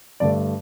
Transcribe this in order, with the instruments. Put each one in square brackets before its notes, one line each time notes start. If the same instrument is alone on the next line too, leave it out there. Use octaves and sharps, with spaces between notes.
[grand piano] G2 D3 A3 D5